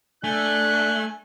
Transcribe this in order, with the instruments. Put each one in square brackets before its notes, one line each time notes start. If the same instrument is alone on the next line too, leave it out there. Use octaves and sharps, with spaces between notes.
[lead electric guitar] A3 [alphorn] D4 [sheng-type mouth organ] G#5 [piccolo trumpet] F#6